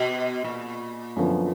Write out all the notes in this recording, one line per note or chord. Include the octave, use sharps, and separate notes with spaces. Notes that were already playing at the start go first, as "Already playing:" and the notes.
Already playing: B2
A#2
F#2 D3 F3 B3